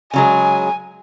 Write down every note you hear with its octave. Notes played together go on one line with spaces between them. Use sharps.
C#3 F#3 G#3 G#5